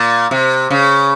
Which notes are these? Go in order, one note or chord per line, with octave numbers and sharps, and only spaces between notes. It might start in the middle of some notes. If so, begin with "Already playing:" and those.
Already playing: A#2
C3
C#3